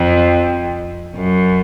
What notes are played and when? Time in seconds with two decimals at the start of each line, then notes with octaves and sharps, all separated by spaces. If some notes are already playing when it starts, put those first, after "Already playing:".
Already playing: F2
1.15 F#2